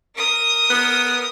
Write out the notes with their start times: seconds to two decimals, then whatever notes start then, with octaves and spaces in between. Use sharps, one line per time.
0.16 A#4 D#6
0.70 B3